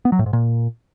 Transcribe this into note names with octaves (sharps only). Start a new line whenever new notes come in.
B3
F#3
A2
G#2
A#2